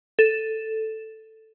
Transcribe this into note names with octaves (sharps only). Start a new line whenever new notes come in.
A4